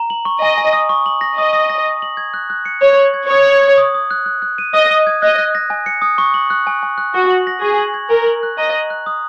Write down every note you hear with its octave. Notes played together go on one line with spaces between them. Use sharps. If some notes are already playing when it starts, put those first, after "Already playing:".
Already playing: A#5
F#7
C#6
D#5 G#5
G#5
D#6
C#6
F#7
A#6
D#5 D#6
D#6
A#6
D#6
F#7
G#6
F#6
F#6
C#7
C#5 C#6
F#7
G#6
C#5 D#6
F#7
G#6
D#6
D#6
F#6
F#6
F#6
D#7
D#5 D#6
D#6
G#6
D#5 F#6
F#6
A#6
G#5
C#7
D#6
C#6
F#7
F#6
G#5
G#5
F#6
F#4 C#6
F#7
A#6
G#4 C#6
F#7
G#6
A#4 G#5
F#7
F#6
D#5 A#5
F#7
F#6
D#6